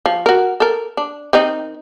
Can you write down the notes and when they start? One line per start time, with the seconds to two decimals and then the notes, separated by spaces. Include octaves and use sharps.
0.06 F3
0.26 F#4 A#4
0.60 A4 A#4
0.97 D4
1.33 D#3 C4 D#4